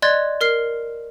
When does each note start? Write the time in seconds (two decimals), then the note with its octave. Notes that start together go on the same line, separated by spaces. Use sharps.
0.02 D5 D#5 C6 F#6 G#6 A6
0.41 A#4 F6 C7